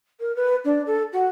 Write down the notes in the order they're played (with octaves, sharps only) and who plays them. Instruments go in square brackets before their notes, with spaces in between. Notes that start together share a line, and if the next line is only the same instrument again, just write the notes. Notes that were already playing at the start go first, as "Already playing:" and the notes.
[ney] A#4
B4
D4
A4
F#4